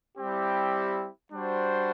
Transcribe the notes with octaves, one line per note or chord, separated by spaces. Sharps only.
G3 C4 E4 G4
G3 D4 F#4 C5